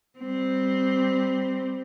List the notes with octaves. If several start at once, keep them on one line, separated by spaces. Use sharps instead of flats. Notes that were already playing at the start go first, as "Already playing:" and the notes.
G3 C4